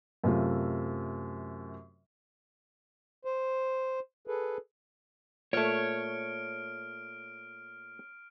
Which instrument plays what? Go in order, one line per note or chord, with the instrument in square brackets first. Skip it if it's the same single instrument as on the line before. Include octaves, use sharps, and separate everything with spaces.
[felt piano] F#2 C3 A3 F4
[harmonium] C5
G#4 A4 B4
[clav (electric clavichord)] A#2 A3 [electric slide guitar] C#5 [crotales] F6 D7